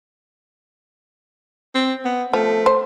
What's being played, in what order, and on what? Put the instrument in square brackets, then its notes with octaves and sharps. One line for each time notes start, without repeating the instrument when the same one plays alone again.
[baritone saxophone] C4
B3
[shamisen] F3 [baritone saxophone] A3
[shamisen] C5